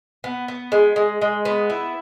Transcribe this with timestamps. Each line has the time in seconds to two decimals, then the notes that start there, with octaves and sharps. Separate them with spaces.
0.24 B3
0.48 B3
0.72 G#3
0.96 G#3
1.21 G#3
1.45 B3
1.70 E4